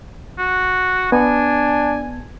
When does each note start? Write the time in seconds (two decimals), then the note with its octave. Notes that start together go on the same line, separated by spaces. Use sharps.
0.39 F#4
1.12 B3 D4 G#5